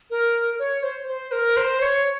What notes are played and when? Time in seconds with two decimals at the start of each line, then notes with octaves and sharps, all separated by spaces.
0.10 A#4
0.59 C#5
0.83 C5
1.08 C5
1.32 A#4
1.57 C5
1.81 C#5